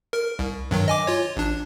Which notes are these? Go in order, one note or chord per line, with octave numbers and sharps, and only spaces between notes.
A#4
C2
G2 D#3 F#3
D#5 G#5 D6
F4 C#5
A1 D4